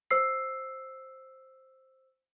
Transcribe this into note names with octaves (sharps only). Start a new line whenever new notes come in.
C5 E6 C7